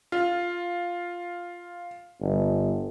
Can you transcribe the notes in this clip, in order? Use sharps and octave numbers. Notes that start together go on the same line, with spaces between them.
F4
G1